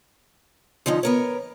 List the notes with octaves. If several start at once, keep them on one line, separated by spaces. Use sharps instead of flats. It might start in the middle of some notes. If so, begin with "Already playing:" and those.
D3 F3 C#4 D#4
B3 A#4 C#5